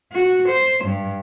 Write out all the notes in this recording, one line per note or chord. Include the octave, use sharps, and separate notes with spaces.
F#4
C5
G2